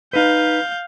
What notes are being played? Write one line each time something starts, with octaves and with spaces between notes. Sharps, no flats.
D#4 B4 F5 G6